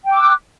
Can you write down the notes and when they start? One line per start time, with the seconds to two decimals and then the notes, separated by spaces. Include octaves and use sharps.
0.06 G5
0.10 D6
0.15 E6
0.19 F#6